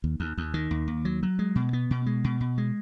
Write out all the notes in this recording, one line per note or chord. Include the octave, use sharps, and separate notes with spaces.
D#2
D#2
D#2
D#3
D#2
D#2
F#3
F#3
G#3
B2
B3
B2
G#3
B2
B2
G#3